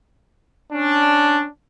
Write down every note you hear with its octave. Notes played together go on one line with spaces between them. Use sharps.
C#4 D4